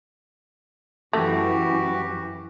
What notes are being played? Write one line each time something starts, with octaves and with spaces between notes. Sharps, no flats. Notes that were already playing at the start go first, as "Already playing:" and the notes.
F#2 E3 A3 F#4 G4